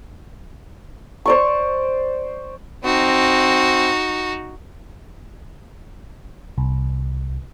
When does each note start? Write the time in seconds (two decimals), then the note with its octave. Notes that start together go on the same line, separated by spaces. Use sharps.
1.26 C5 D5 C#6
2.85 C4 D#4 F#4
6.58 C2